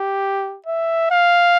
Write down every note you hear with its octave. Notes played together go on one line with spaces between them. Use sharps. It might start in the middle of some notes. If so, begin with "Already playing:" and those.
Already playing: G4
E5
F5